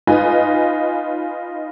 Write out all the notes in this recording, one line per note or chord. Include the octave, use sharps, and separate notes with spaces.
D#4 F4 B4 D#5 G#5